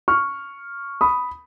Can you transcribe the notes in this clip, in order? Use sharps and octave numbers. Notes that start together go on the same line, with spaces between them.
C#6 F6
B5 D#6